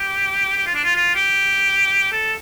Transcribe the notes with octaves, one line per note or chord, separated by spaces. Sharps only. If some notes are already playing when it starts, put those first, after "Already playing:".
Already playing: G4
G4
F4
D4
F4
F4
G4
A4